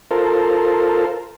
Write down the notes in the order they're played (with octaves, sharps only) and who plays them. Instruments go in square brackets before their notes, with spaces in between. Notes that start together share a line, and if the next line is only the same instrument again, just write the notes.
[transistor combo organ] F4 A4 A#4 C5